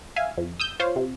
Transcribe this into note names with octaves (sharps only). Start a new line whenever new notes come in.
E5 F5 G#5
F2
D#6 E6 G6
F4 C5 C#5 F5
C3